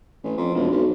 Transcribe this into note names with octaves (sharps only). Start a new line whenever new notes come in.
A1
F2
E1
B1